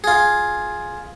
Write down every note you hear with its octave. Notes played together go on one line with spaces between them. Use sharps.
F4 G#4